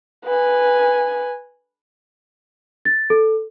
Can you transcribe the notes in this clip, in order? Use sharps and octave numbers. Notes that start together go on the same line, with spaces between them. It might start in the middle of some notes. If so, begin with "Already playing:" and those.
B4 G#5
A6
A4